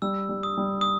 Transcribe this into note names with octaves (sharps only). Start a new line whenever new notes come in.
G3 E6
G3
D#6
G3
D#6